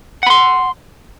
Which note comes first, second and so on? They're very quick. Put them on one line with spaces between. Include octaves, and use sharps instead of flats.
F#5 B5 C6